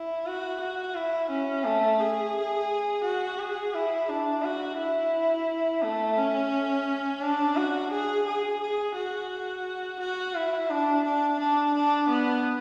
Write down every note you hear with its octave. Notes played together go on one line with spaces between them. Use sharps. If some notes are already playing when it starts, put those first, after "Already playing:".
Already playing: E4
F#4
F#4
E4
C#4
A3
G#4
F#4
G#4
E4
D4
F#4
E4
A3
C#4
D4
F#4
G#4
G#4
G#4
F#4
F#4
E4
D4
D4
D4
D4
B3